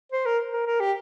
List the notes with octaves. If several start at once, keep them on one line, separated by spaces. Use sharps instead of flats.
C5
A#4
A#4
A#4
G4